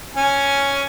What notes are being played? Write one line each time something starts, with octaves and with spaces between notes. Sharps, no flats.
C#4 G#5